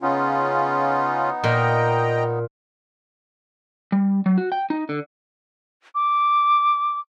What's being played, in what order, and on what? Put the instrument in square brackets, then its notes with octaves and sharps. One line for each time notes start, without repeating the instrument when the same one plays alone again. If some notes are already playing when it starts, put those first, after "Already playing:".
[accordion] C#3 C#4 F4 [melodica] B3 D#4
[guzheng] A#2 [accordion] D#5 G5 A#5
[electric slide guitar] G3
F#3
F#4
G5
D#4
D3
[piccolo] D6